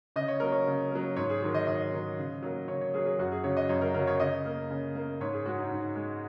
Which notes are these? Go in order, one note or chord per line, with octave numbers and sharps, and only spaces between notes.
C#3 D#5
C#5
F#3 A#3 A#4
C#5
C#3
F#3 A#3
G#2 C#5
G#4
D#3 F#3 C#5
D#5
G#2 D#5
D#3 F#3
C#3
F#3 A#3
C#3 C#5
C#5
F#3 A#3 G#4
G#4
F#2 F#4
G#4
C#3 F#3 C#5
D#5
F#2 C#5
A#4
C#3 F#3 A#4
C#5
C#3 D#5
A#3
C#3
A#3
G#2 C#5
G#4
G#3 F#4
D#4
G#2
G#3